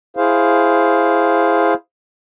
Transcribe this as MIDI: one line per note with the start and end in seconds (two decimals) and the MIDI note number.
0.17 1.74 64
0.17 1.74 68
0.17 1.74 72
0.17 1.74 77